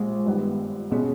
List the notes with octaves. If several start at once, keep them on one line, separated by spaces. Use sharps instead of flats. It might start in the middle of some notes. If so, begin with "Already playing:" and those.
Already playing: A#1 A#2 G3 G#3
G1 G2 D#3 G3 B3
B2 G#3 B3 C#4 G#4